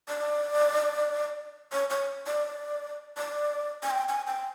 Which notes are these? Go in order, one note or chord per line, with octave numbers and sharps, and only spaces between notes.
D5
C#5
C#5
D5
D5
G#5
G5
G#5
G5